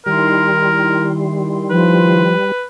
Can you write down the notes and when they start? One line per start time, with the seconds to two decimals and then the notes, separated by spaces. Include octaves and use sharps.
0.06 D#3 G3 E4 A#4 C6
1.71 F3 B4